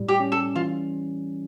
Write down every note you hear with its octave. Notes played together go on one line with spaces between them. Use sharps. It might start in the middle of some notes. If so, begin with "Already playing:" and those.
Already playing: A2 G3
G4
C#4
A4
E3 F4